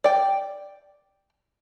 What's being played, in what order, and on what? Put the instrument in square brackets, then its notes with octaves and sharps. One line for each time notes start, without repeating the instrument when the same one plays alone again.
[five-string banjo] D5 G5